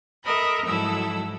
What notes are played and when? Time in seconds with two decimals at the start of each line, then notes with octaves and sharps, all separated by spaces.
0.24 A4 A#4 D#5 E5 B5
0.65 G#2 F3 F#3 E4 A4 E6